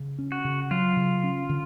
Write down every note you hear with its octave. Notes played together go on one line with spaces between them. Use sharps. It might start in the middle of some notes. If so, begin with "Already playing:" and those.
Already playing: C#3
C#4
F#4
C#3
F#3 F4
C#3
C#4
D3